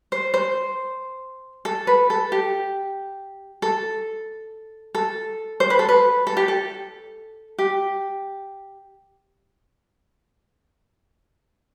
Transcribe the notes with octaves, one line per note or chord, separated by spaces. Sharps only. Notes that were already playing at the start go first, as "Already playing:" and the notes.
C5
C5
A4
B4
A4
G4
A4
A4
C5
B4
A4
B4
A4
G4
A4
G4